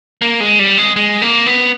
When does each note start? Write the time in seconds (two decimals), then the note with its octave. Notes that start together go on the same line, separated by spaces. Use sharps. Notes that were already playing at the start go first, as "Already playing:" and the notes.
0.22 A#3
0.40 G#3
0.59 G3
0.78 G#3
0.96 G#3
1.22 A#3
1.46 B3